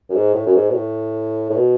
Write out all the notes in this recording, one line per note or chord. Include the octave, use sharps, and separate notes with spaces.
F#2
G#2
A2
F#2
G#2
B2
A2
A2
B2